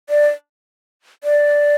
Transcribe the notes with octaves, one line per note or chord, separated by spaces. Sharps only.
D5
D5